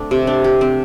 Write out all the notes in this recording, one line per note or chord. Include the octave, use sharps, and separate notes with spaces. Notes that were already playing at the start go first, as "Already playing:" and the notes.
Already playing: A3 C4 D4
C3
D4
G4
C4